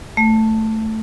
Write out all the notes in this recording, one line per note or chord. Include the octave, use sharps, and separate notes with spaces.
A3